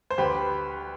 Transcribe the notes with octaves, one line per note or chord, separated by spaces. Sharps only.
C5
D2 G4 B4